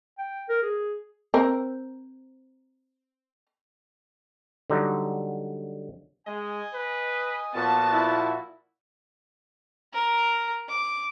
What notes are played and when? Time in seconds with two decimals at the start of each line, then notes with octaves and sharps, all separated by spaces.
0.18 G5
0.49 A#4
0.63 G#4
1.34 C4 A#4
4.70 D3 F#3 G3 D#4
6.27 G#3 D#5 G#5
6.74 B4
7.55 A#2 F3 B3 F#4 A5
7.93 E4
9.92 A#4
10.68 D6